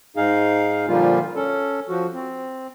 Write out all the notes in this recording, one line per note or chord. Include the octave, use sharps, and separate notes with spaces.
G#2 D#4 G#4 F5
A#2 D3 F3 G3 A#3 F4
C#4 A4
F3 F#4
C4